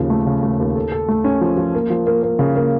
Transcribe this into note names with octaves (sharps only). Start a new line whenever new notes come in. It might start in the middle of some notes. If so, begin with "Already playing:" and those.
Already playing: D#2 C#3 F3
A3
C#3
A3
D#2
A4
A4
A3
C#4
F3
F3
A#3
F3
A#3
A#3
C#3
A#3